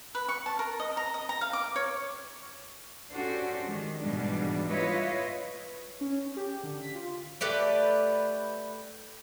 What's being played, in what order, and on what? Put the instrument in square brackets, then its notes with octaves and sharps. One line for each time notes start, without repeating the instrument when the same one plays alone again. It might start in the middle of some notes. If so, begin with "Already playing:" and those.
[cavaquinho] B4
C#6
A5
A#4
D#5
A#5
D#5
A#5
F5
D6
C#5
[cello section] C#4 D4 F#4 G4 A4 C5
D#3 G#3
G#2 B2 E3 G3 G#3 D4
E4 F4 B4 C#5 D#5 E5
[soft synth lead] C#4
G4
D3
B6
F4
[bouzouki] A3 G4 B4 D5